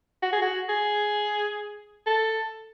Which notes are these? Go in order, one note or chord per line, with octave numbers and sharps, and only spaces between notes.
F#4
G#4
F#4
G#4
A4